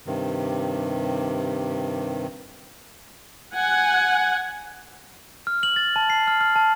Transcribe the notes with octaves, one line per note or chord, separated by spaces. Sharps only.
G2 C3 D#3
F#5 G#5
F6
F#7
A6
A5
C7
F6
F6
A5